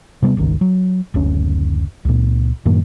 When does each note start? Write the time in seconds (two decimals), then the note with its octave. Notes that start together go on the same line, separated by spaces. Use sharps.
0.22 C3 G3 B3
0.37 G1 C#2 D#3
0.61 F#3
1.14 F#1 D2 C#4
2.05 C#2 A#2
2.66 F#2 A2 D#3 A#3